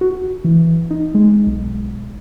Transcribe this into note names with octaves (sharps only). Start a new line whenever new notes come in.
F#4
E3
D#4
G#3
B1